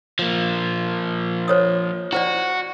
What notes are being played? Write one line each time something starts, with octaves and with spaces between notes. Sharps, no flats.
F3 A#3
C5 C#5 D#6
E4 F#4 C5 D5